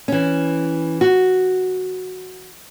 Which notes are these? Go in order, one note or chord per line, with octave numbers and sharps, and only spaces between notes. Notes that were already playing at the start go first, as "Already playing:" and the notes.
E3 C#4
F#4